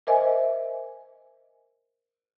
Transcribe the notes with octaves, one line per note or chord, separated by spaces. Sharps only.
A#4 C5 D#5 E5 G#5